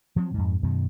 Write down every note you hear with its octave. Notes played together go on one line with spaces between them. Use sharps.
F3 F#3 A#3 C4
F2 G#2
F#2 B2 D#3